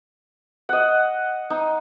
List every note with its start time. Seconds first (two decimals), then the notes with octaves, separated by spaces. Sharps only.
0.69 D#5 F#5
1.50 D#4